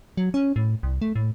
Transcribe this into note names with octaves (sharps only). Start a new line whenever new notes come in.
F#3
C#4
A2
C2
A3
A2